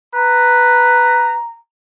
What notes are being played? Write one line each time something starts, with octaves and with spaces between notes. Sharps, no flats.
B4 A#5